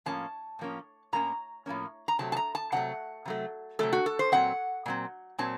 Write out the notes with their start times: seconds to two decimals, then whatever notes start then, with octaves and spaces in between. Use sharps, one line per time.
0.06 A2 F3 A#3 C#4 A5
0.59 A2 F3 A#3 C#4
1.13 A2 F3 A#3 C#4 A#5
1.66 A2 F3 A#3 C#4
2.08 A#5
2.19 C3 F#3 A3 A5
2.32 A5
2.37 A#5
2.55 A5
2.72 C3 F#3 A3 F#5
3.25 C3 F#3 A3
3.79 C3 F#3 A3 A4
3.93 F#4
4.06 A4
4.19 C5
4.32 A#2 F#3 C4 F#5
4.86 A#2 F#3 C4
5.38 A#2 F#3 C4 A5